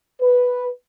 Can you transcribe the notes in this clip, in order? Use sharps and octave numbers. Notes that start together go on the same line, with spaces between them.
B4